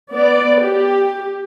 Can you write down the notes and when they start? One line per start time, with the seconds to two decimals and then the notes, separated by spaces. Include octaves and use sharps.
0.13 B3 D5
0.63 G4